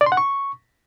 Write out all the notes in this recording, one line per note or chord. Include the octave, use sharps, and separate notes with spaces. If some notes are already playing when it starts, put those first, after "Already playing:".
D5
C6
F#5
C#6